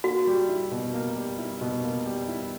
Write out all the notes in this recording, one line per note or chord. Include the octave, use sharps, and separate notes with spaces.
A#3 F#4
G3
E4
B2
A#3
G3
E4
B2
A#3
G3
E4